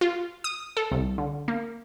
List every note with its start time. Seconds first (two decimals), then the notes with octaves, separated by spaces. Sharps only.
0.01 F4
0.44 D#6
0.77 A4
0.92 C2
1.18 D3
1.48 A#3